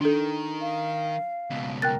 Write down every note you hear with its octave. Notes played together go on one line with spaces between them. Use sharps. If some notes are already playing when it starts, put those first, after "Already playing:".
D#3 D4 A4
F5
C#2 B2
A#4 G5 F#6 A6